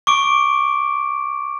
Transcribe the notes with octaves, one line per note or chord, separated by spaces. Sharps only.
C#6 D6 D7